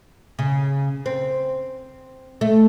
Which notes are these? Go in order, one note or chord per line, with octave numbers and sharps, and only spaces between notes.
C#3
C4
A3